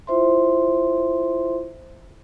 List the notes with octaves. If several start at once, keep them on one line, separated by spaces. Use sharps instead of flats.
E4 F4 C5 E5 C6